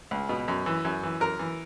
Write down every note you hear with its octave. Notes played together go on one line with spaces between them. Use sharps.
C#2
B2
F#2
E3
F#2
E3
F#2 A#4
E3